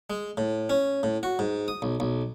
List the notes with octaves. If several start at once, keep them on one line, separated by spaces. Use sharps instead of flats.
G#3
A2
C#4
A2
F#4
G#2
D#6
B1
B1